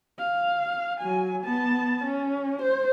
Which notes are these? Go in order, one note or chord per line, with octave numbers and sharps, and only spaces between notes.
F5
F#3 G#5
B3 A5
C#4
C5